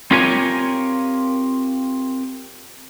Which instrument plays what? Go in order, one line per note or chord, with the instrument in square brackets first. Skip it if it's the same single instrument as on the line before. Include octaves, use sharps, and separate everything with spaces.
[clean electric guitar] C4 F4 G4 A#4 C#5 G#5